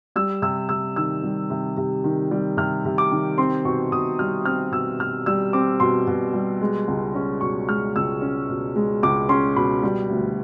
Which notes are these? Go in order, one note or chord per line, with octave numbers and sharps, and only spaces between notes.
G3 E6
C3 E6
C3 E6
D#3 E6
G3
C3
C3
D#3
G3
C3 F6
C3
D6
D#3
C4 C6
B2 C#6
B2 D#6
G3 F6
C4 F6
B2 E6
B2 F6
G3 E6
C4 D6
B2 C6
B2
G3
G#3
C#2
C#4
B2 C#6
G#3 F6
C#2 E6
C#4
B2
G#3
C#2 D6
C#4 C6
B2 B5
G3
D2